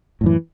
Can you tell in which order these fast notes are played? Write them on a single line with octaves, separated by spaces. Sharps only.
A2 F#2 E3